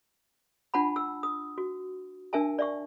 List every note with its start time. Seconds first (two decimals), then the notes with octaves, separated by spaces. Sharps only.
0.74 D4 F4 F#5 A5 B5
0.96 E6
1.23 D#6
1.58 F#4
2.33 D4 A#4 E5 G#5 A5
2.59 D5 E5 C#6